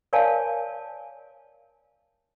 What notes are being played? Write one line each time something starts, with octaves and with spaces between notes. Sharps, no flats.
A#4 C#5 D5 F5 G#5 A5